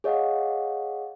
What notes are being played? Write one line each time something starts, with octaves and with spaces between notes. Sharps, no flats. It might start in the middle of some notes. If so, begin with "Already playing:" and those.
G#4 C#5 D#5 F5 F#5